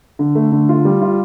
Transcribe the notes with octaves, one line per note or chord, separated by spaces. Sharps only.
D3
A3
D3
F4
G3
F4